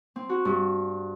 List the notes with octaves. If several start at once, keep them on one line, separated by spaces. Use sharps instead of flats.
C4
F#4
G2